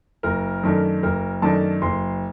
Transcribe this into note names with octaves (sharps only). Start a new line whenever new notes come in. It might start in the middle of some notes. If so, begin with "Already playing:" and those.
F#1 A#4
F#2 D#3 A3 D4
F#1 A#4
F#2 D#3 A3 D4 A5
F#1 C6